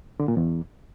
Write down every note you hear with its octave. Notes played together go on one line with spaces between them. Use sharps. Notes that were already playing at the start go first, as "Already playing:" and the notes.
D3
A#2
E2